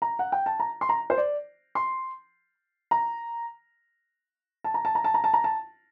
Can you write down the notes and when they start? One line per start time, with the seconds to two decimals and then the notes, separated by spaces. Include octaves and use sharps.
0.02 A#5
0.19 F#5
0.32 G5
0.46 A5
0.60 A#5
0.81 C6
0.89 A#5
1.10 C5
1.18 D5
1.75 C6
2.91 A#5
4.64 A5
4.74 A#5
4.85 A5
4.95 A#5
5.04 A5
5.14 A#5
5.24 A5
5.34 A#5
5.44 A5